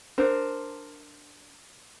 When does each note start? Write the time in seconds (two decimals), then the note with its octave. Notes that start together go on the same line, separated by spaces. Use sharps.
0.18 D4 A#4 C5